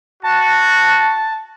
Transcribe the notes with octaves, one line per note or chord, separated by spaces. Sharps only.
F#4 A5